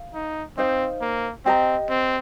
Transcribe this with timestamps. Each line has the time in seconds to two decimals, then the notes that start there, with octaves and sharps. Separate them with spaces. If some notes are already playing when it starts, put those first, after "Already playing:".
Already playing: F5
0.14 D#4
0.58 C4 D#4 C5 F5
1.01 A#3
1.46 C4 G4 D#5 A#5
1.90 C4